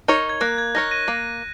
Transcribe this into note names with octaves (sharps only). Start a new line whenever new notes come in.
D#4 A#4 C#5
G#6
A#3 F#6
G#6
D#4 A#4 C#5 A#6
A#6 D#7
A#3